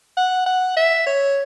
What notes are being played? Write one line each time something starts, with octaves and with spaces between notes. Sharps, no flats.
F#5
F#5
E5
C#5